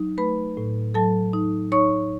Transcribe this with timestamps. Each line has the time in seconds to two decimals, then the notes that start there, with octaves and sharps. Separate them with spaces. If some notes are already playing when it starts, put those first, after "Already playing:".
Already playing: F#3 D#4
0.18 A3 B4 B5
0.57 A2
0.94 F#3 A4 A5
1.33 D#4
1.72 D#4 C#5 C#6